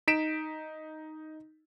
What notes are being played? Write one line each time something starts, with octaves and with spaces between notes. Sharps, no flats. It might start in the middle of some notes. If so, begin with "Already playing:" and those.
D#4 B6 D7 E7